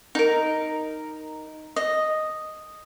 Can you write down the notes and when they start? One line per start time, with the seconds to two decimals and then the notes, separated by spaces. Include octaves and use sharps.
0.15 D#4 A#4
1.76 D#5